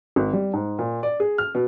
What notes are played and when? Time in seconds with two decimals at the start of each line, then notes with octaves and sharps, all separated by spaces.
0.16 G#1
0.33 G3
0.53 G#2
0.79 A#2
1.03 D5
1.20 G#4
1.38 F6
1.55 B2